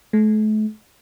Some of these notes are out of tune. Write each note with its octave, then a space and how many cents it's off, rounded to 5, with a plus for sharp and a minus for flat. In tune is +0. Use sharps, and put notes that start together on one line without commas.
A3 -40